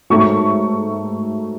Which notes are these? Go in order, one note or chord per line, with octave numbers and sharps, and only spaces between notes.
G#2 F#3 A3 C#6